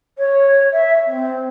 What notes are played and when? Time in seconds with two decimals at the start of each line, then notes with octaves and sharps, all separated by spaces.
0.18 C#5
0.72 E5
1.07 C4